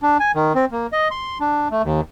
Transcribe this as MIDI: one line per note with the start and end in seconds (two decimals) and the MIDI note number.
0.03 0.17 62
0.20 0.32 80
0.35 0.53 51
0.55 0.65 60
0.72 0.87 58
0.92 1.08 75
1.11 1.38 84
1.40 1.68 62
1.71 1.82 57
1.83 2.01 39